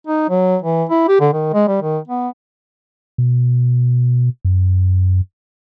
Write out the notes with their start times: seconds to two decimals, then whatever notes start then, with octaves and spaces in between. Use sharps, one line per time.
0.07 D#4
0.29 F#3
0.62 E3
0.89 E4
1.08 G4
1.20 D3
1.33 D#3
1.53 G#3
1.68 G3
1.82 D#3
2.08 B3
3.18 B2
4.45 F#2